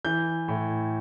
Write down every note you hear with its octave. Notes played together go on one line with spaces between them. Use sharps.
E3 G6
A2